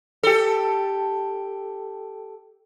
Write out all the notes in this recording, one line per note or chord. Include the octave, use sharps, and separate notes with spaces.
G4 A4